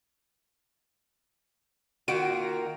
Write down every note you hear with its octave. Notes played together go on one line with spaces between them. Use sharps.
D#3 A#3 F4 F#4 D7